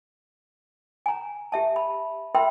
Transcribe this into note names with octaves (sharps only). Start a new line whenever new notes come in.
G#5 A#5
G4 E5 A5
B5
A#4 B4 E5 G5 B5 C6